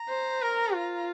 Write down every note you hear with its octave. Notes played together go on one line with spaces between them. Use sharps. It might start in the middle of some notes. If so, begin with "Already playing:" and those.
Already playing: A#5
C5
A#4
F4